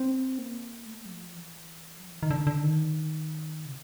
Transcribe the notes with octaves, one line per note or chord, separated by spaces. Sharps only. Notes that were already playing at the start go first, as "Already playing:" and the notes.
Already playing: C4
A#3
A3
F#3
F3
E3
F#3
F3
E3
D#3
D3
D3
D#3
C3